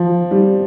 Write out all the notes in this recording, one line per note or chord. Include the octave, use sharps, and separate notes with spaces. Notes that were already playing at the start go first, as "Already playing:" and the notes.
Already playing: F3
G3